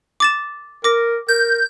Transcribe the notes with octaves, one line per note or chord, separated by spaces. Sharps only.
D6 A6 E7
A#4 D6 A#6
A#4 G6